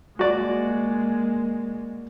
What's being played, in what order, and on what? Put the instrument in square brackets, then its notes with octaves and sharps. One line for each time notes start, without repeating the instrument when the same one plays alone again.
[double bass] G#3 A#3 [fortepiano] F#4 D5